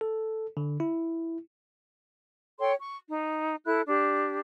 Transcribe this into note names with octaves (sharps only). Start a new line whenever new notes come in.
A4
D3
E4
A4 C#5 G5 C6
C#6
D#4
E4 A4 F#6
D4 G4